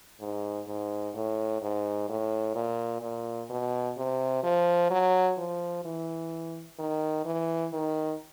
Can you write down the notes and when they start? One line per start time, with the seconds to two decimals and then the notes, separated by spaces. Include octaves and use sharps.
0.20 G#2
0.67 G#2
1.15 A2
1.62 G#2
2.09 A2
2.55 A#2
3.02 A#2
3.50 B2
3.97 C3
4.43 F3
4.90 F#3
5.38 F3
5.85 E3
6.79 D#3
7.25 E3
7.73 D#3